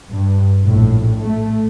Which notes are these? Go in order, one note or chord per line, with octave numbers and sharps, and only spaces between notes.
G2
A#1 A2
A3